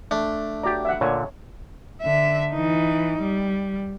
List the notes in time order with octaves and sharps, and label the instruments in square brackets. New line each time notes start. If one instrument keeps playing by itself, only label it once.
[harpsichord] A3 D4
[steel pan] F#4 A#5 [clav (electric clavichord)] G4 D5
[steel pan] E5 F#5
[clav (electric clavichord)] A#2 D3 [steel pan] C#5
[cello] D3 E5
E3 D#4
G3